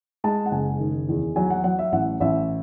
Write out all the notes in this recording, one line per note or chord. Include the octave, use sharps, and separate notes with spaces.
G#3 A5
F#5
F#1 G#5
D#3
E2
F#3 G#5
F#5
F#3 F#5
E5
A1 F#5
A1 E5